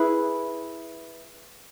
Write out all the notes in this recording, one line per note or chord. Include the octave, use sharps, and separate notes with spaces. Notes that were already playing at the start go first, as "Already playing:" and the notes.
Already playing: E4 G#4 B4